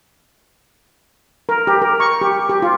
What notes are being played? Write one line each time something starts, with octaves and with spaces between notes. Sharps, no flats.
A#4
G4
A#4
C#6
G4
G4
F4